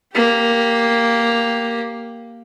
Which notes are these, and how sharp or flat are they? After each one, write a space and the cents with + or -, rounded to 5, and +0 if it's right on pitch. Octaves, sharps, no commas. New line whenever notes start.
A#3 +0 G4 +0